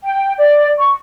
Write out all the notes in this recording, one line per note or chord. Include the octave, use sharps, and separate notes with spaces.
G5
D5
C#6